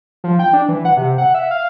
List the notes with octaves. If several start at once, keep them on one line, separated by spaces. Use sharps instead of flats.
F3
G5
D4
E3
F#5
C3
F#5
E5
F5